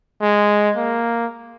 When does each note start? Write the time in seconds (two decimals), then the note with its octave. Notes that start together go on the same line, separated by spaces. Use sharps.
0.21 G#3
0.76 A#3